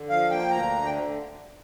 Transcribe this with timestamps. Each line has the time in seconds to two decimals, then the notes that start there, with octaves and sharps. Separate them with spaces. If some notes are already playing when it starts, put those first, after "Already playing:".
Already playing: D3
0.09 F3 F5
0.30 A#3 G5
0.50 D2 A#5
0.71 D3
0.85 G5